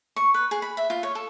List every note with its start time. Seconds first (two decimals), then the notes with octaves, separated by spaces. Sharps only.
0.16 C#6
0.34 B4
0.51 G#4
0.62 B5
0.77 E5
0.90 F4
1.03 C#5
1.15 A4